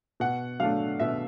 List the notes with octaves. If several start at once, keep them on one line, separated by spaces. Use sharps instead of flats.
B2 F#5
F#3 A3 D4 F5
B2 E5